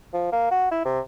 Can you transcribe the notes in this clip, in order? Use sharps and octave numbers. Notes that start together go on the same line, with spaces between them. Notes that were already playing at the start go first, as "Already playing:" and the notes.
F3
A#3
F#4
E4
C3